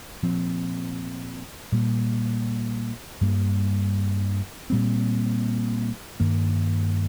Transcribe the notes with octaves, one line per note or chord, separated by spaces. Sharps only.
A#2 F3 C4
A#2 G3 A#3
G2 G3 A#3
A#2 G3 C4
G2 D#3 A#3